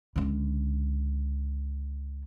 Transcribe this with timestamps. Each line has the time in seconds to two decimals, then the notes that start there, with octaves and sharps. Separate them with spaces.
0.16 C#2 D3